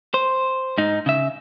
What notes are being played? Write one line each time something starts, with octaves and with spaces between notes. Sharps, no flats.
C5
G#2 D#4
C#3 E5